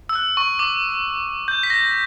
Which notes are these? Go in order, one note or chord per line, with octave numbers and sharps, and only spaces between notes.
E6
F#6
C#6
D6
G6
B6
A#6